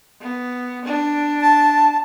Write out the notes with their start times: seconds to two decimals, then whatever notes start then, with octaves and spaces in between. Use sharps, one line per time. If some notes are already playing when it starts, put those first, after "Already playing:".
0.21 B3
0.85 D4
1.41 A5